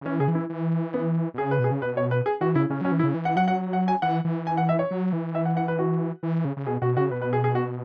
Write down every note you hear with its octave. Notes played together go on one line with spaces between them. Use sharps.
C#3
E3 C#4
C#3 G#4
E3
E4
E3
B3
B2
C#3 G#4
B4
B2 G#4
C#3
B2 B4
C#5
B4
G#4
E3 F#4
C#3 E4
C#3 C#4
F#3 C#4
E3
E4
C#3
E3
F#5
F#3 F#5
F#5
F#5
G#5
E3 F#5
E3
G#5
F#5
E5
C#5
F#3
E3
E5
F#5
F#5
B4
F#4
E3
C#3
C#3
B2 G#4
B2 F#4
C#3 F#4
B2 B4
B4
G#4
G#4
F#4